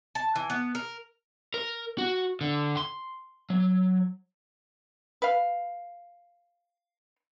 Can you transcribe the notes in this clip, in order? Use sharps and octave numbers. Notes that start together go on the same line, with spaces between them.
A5
E3
B3
A#4
A#4
F#4
D3
C6
F#3
B4 F5